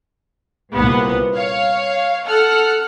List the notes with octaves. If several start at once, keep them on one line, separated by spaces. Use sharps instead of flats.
C2 A#2 B3 F#5
C#5 F5
A4 F#5 F6